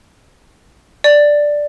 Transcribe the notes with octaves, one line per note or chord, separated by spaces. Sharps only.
D5